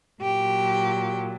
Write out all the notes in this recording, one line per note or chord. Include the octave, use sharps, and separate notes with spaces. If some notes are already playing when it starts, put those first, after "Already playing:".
A#2 F#3 G4